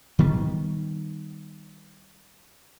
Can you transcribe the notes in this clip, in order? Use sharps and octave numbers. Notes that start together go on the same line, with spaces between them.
D#3 G3 B3